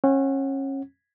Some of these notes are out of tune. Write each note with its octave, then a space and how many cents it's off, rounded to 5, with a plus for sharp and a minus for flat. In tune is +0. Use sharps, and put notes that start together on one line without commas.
C#4 -30 F#5 +5